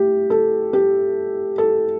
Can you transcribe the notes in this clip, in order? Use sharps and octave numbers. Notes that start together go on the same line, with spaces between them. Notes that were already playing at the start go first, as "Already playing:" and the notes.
Already playing: A3 G4
A4
G4
A4